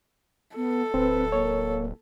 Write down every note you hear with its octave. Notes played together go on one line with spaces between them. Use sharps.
B3 A4
D1 C4 B4
A#3 C#5